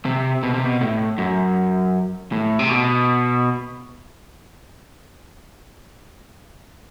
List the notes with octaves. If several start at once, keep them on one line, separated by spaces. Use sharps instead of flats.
C3
B2
C3
B2
A2
F#2
A2
C3
B2